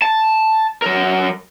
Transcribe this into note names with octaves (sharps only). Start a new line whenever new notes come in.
A5
F#3 A#4